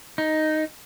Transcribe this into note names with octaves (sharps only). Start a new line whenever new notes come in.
D#4